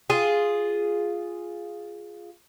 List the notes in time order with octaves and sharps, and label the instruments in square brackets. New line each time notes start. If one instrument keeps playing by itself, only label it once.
[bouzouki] F4 G#4